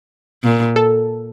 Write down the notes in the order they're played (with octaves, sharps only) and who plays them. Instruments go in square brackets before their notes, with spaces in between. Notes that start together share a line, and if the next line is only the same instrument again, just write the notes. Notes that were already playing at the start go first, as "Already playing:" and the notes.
[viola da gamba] A#2
[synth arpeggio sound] A4